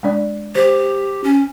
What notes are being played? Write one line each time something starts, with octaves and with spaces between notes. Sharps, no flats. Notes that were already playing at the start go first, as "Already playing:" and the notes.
G#3 D4 D5
G4 C5
C#4